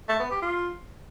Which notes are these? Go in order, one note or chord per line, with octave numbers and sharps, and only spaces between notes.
A3
B3
G4
F4